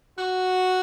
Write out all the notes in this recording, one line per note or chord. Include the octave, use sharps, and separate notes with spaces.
F#4